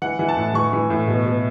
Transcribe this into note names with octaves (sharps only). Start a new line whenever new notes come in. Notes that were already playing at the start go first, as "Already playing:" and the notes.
E3 F#5
E3
A5
A2
E3 C#6
E3
A2
B2
B2